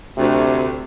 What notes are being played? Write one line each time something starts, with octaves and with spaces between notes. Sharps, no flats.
D2 C3